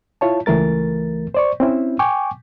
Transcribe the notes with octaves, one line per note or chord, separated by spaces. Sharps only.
E4 F4 C#5 A5
C#2 E3 A3 A#4 A6
C5 D5 C#6
C4 C#4 E4
G5 G#5 C#6 D6